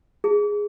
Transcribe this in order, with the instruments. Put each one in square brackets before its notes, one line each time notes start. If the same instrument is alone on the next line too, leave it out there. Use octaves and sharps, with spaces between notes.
[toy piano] G#4